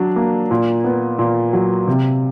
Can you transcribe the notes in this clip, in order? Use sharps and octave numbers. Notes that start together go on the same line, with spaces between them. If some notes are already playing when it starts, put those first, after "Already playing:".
Already playing: F#3 D4
A#3
A#2
B3
A#2
F#3
C3